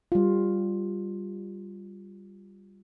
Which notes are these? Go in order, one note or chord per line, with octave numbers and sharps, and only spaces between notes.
G3 F4